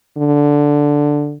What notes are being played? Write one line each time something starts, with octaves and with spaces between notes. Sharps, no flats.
D3